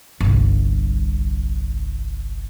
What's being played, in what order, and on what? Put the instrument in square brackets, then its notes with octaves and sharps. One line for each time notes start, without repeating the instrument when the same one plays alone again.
[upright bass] G1 C2